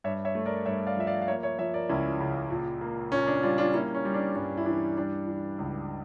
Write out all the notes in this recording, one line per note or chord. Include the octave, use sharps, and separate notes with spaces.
G2 C#5 E5
C#5 E5
A3
A#4 D5
G2 C#5 E5
D5 F5
F3 E5
D5 F5
F5
A#3 C#5 E5
C#5 E5
F3 C#5 E5
A#4 D5
C#2 C#4 E4
C#3
A#2
A#3
A#2 C#4
D4
G3 D4 F4
D4 F4
A#3 C#4 E4
C#4
G3
D4
G2 C#4
E4
E3 D4
G3 D4
E3
C#2